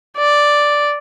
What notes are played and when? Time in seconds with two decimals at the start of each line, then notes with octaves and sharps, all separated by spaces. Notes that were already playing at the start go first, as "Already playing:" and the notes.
0.18 D5